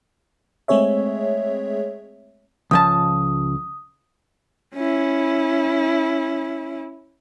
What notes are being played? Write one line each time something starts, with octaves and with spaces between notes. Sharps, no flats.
G#3 A3 C4 G#4 C#5 E5
C#2 F3 A5 D#6
C#4 E4